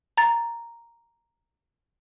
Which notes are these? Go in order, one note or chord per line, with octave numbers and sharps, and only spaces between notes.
A#5 A6